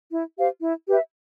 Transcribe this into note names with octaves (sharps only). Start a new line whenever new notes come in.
E4
G4 C5 F5
E4
G4 B4 E5